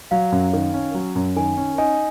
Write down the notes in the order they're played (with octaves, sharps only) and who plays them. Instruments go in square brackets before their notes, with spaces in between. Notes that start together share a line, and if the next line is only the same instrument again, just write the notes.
[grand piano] F#3 [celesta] F5
[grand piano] F#2
D#3
C#4
F#3
F#2
[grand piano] D#3 [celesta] G#5
[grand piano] C#4
[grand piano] D#4 [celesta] G#5